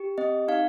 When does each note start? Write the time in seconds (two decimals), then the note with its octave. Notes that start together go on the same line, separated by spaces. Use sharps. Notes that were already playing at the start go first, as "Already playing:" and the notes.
Already playing: G4
0.18 C4 D#5
0.48 D#4 F5